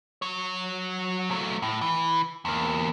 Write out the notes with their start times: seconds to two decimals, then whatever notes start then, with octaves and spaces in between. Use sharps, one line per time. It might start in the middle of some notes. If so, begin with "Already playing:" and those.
0.22 F#3 C#5
1.31 F#3 A3
1.62 A2
1.81 E3
2.45 E2 A#3